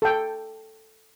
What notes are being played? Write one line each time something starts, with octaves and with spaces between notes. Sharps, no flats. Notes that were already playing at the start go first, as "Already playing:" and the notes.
A4 G5